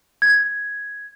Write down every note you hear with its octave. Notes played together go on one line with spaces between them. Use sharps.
G#6